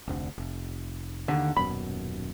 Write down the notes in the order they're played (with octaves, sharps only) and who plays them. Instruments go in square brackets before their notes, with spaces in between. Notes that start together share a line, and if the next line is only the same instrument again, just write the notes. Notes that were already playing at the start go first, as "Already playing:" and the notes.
[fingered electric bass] F1 D2 D3
F1
[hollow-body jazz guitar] D#2 D3
[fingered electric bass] D#1 F#2 B2 [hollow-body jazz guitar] B5